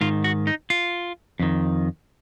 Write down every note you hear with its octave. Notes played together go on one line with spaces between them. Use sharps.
G#2 D#3 F4
F#4
D#4
F4
F2 D#3